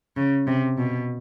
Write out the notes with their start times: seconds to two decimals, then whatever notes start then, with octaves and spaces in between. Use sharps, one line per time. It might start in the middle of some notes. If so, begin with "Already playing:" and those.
0.17 C#3
0.47 C3
0.77 B2